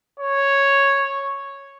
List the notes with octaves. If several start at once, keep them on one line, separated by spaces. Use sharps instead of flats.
C#5